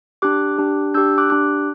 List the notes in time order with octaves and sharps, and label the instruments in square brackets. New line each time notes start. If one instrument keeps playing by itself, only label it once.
[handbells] D4 G4 D6 F#6
D4 G4
D4 G4 E6 G6
D6 F#6
D4 G4 D6 F#6